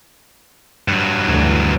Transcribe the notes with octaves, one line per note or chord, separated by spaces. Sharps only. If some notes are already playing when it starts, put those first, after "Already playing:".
G2 F#3
D2 E3